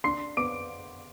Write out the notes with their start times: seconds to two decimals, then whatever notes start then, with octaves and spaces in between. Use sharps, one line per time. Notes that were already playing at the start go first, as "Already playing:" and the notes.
0.04 D4 C6 C7
0.37 B3 D6 D7